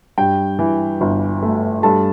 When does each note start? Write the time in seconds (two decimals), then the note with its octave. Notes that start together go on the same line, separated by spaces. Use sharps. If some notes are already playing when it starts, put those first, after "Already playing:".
0.18 G2 G5
0.59 E3
1.01 G1
1.42 A3
1.83 G2 A4 A5